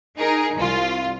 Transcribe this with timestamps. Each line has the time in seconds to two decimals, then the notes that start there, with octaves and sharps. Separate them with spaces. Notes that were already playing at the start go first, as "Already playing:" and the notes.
0.16 D#4 G#4 A#4
0.56 C2 F4